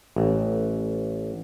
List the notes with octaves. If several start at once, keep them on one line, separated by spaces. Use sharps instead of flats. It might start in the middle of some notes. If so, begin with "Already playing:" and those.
A1